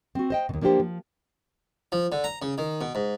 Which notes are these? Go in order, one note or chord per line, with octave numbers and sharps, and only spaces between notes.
C4 F#4
C5 D#5 G5
D#2 B2
F3 A#3 D4 F4 G4 C5
F3
F3
D3
A#5
C#3
D#3
B2
G#2